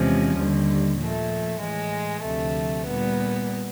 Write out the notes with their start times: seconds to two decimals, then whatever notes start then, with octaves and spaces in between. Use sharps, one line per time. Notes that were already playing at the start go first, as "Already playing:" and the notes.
Already playing: E2 C3 F3 G#3 C#4
0.36 D#2 D3 G3
0.99 A#2 F3 A3
1.61 A2 E3 G#3
2.23 D2 C3 F3 A3
2.86 A#2 G3 B3